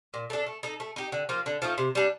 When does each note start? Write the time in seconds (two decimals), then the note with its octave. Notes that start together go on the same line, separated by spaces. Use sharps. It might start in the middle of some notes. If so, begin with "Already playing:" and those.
0.14 A#2
0.30 A3 D4 A4
0.47 A3
0.63 D#4 A4
0.80 A3
0.96 D#4 G4
1.12 D3
1.29 F3 A#3 F4
1.46 D3
1.62 F3 A3 D#4
1.78 C3
1.95 G3 D4